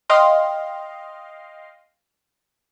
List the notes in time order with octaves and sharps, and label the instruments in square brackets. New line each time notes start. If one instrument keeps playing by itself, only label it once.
[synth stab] D#5 F5 G5 C6